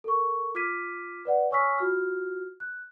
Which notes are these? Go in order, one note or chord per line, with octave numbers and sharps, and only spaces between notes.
A4 A#4 C#6
F4 D6 F6 G#6 B6 D#7
B4 D5 F#5
C#5 G#5 C#6 E6 F6 B6
F4 F#4 F6
F#6